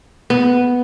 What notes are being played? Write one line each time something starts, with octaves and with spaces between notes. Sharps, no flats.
B3